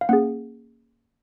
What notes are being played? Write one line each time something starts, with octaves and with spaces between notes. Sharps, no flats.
F5
A#3 C#4 G#4 F#5